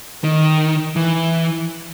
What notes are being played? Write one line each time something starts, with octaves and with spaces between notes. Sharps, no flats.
D#3
E3